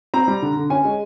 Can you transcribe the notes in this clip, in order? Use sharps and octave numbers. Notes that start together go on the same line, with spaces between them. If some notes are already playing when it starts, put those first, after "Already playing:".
C4 A#5
G3
D3
D3
C#4 G#5
G#3